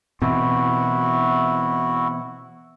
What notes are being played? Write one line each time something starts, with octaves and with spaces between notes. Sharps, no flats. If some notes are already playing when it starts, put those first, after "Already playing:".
B2 E3 C4 E4 F#4